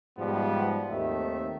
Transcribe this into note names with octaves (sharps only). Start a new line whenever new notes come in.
G#2 B2 F3 G3 G#3 B3
D#2 D#3 A3 C4 G4 E5